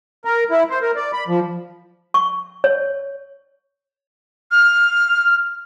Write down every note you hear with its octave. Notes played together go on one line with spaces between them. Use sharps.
A#4
E4
C5
A#4
D5
B5
F3
C#6
C#5
F6